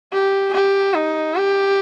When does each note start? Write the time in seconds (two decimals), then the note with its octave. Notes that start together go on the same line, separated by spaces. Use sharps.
0.13 G4
0.54 G4
0.94 D#4
1.36 G4